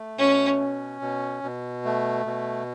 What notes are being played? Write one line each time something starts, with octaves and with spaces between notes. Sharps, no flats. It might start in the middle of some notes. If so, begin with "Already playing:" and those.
Already playing: A3
B2 C#4
C#4
B2
B2
A3
B2